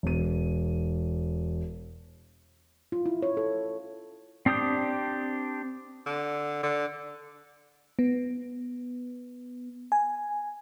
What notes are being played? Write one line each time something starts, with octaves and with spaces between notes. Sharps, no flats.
E1 D#7
F4
E4
C#5
A4
C4 D4 G4 D#6 G6
D3
D3
B3
G#5